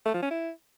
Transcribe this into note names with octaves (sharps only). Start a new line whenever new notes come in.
A3
F3
C#4
E4